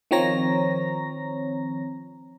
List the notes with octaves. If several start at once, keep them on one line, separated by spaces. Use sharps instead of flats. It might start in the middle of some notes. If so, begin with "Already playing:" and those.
D#3 F3 C4 C#5 A#5 A#6